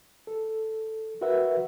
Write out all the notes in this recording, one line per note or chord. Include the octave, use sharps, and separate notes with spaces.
A4
F#4 A#4 B4 E5 F#5